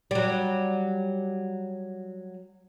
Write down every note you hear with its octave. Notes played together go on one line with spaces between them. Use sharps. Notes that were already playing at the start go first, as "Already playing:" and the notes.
F#3 G3